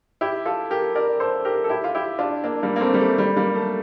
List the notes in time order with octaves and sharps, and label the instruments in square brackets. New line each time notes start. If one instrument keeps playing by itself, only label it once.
[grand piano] E4 G4
F4 A4
G4 A#4
A#4 D5
A4 C5
G4 A#4
A4
E4 G4
F4
E4 G4
D4 F4
A#3 D4
G3 A#3
A#3
A3 C4
G3
A3
G3
G3 A#3
A3